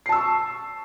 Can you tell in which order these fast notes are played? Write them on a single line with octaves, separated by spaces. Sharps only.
C7 A5 E6 C#6